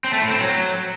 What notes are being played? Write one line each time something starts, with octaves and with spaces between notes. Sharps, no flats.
C4
A3
A2
C4
F#3